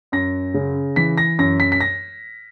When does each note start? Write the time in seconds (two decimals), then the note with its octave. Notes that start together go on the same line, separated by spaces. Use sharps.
0.12 F#2 A#6
0.54 C#3
0.96 E3 B6
1.18 A#6
1.39 F#2 A#6
1.60 B6
1.72 B6
1.81 A#6